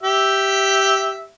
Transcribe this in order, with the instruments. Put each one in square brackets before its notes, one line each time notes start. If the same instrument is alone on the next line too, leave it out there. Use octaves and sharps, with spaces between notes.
[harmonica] G4 E5